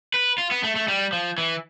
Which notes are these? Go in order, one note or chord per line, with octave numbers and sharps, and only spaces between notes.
B4
F4
B3
A3
A3
G3
F3
E3